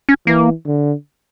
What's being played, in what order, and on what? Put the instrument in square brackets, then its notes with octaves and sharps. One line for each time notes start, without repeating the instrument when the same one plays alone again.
[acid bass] C#4
[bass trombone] E3 [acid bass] A#3
[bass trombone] D3